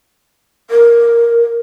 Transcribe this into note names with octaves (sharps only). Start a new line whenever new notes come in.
A#4